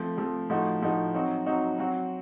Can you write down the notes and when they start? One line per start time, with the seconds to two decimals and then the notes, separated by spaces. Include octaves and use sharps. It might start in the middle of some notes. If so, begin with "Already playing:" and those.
Already playing: F3 A3 C4
0.17 F3 A3 C4
0.49 A2 F3 A3 D#4 F#4
0.81 A2 F3 A3 D#4 F#4
1.14 F#3 C4 D#4 F#4
1.46 F#3 C4 D#4 F#4
1.79 F#3 C4 F#4